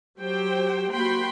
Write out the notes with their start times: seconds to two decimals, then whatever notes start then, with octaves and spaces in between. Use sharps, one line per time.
0.19 F#3 G4 C5 G5
0.92 A#3 F#4 G5 B5 C6